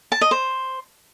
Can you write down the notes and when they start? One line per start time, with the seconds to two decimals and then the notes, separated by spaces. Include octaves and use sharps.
0.12 A5
0.21 D#5
0.31 C5